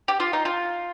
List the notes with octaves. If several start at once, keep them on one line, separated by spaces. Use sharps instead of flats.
G4
F4
D#4
F4